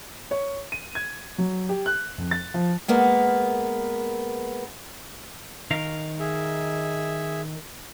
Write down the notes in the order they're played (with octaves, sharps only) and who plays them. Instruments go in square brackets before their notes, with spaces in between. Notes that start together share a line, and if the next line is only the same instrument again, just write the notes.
[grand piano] C#5
D#7
G#6
F#3
G4
F#6
F2
A6
F3
[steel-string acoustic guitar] G#3 A#3 B3 A#4
[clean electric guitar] D#3 A#4 F5
[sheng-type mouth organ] G#4 E5